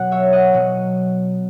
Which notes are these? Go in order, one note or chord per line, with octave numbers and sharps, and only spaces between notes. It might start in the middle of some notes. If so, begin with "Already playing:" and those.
Already playing: B2 F#3 F#5
C#5 E5
D#5 F#5
B2 F#3